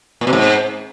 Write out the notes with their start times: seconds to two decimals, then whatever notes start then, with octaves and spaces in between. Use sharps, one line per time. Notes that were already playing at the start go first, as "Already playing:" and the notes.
0.21 A#2
0.27 B2
0.33 G#2